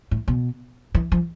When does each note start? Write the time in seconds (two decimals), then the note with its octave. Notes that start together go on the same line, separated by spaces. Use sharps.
0.11 A2
0.28 B2
0.95 E3
1.12 F3